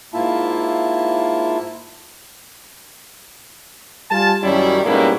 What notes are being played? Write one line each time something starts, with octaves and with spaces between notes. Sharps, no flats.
G#2 A#3 E4 F4 E5 A5
G3 F4 G#5 A5
F#2 D#3 F#3 G3 C#4 E4
G#2 B2 G3 A#3 C#4 E4